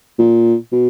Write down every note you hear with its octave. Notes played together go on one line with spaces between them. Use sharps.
A#2
B2